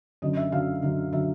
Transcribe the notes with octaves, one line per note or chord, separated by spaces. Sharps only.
F#2 D3 F#3 D#5
E5
F#2 D3 F#3 F5
F#2 D3 F#3
D3 F#3 E5